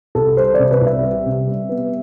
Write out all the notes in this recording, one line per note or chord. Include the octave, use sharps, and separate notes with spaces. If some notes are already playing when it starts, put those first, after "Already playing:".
C2 A4
G3 C5
D5
C3
B4
C2
E5
G3
C3
G3
B3